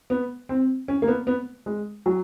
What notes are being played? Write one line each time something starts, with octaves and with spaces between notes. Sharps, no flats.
B3
C4
C#4
A#3
B3
B3
G#3
F#3